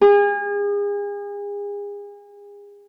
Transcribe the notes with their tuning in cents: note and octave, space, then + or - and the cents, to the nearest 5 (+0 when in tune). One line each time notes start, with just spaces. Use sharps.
G#4 -35